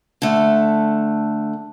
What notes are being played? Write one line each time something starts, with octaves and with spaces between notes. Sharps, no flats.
D3 A3